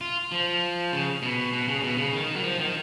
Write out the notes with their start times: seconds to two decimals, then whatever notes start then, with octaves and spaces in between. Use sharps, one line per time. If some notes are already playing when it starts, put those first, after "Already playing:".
0.01 F4
0.32 F3
0.93 C#3
1.22 B2
1.53 B2
1.68 C#3
1.83 B2
1.98 C#3
2.13 D#3
2.36 F#3
2.43 F3
2.59 D#3